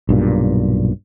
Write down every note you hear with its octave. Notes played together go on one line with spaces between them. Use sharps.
B1 G2 A#2